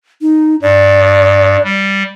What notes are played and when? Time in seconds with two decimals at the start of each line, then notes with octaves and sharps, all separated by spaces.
0.22 D#4
0.62 G2 D5
1.64 G3